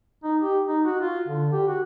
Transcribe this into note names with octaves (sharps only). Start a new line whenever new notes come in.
D#4
G4
D#4
F#4
F4
D3
G4
F#4